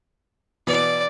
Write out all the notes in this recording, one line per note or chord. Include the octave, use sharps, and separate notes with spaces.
B2 E3 B3 D5